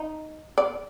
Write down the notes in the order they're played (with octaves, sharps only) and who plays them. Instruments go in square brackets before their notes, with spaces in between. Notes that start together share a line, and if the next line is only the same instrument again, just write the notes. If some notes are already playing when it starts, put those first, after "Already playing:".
Already playing: [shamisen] D#4
D5